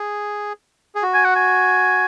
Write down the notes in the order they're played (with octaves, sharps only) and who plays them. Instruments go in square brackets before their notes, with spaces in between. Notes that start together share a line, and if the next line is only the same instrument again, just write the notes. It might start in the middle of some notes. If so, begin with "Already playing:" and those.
Already playing: [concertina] G#4
G#4
F#4
[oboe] G#5
F#5
G#5